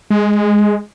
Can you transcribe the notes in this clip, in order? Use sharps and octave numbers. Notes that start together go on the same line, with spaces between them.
G#3